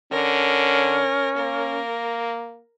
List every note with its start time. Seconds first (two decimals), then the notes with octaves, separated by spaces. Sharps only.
0.12 D3 C#4 A#4
1.37 A#3 A#4